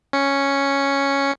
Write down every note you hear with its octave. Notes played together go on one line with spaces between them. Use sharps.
C#4 C#7